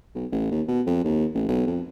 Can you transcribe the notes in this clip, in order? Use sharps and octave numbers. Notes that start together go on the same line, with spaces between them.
B1
A1
D#2
B2
F2
D#2
A1
B1
F2